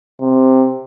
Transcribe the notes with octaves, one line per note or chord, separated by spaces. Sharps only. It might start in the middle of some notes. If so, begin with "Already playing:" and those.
C3